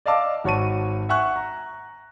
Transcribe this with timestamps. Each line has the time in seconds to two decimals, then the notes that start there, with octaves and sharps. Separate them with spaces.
0.06 D5 D#5 F5 A5 D6 E6
0.44 G#1 F#4 C#5 A5 C#6 D#7
1.09 E5 F#5 G#5 C#6 F#6
1.36 A#5